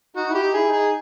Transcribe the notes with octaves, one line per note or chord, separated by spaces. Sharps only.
D#4 F#4
E4 G4
D#4
E4 G#4
D#4 G#4